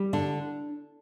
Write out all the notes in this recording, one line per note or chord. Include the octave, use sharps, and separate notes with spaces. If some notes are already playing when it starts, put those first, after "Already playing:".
Already playing: G3
D3 D4